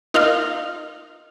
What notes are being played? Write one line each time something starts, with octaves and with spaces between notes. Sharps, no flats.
D#4 F4 A#4 D#5 F5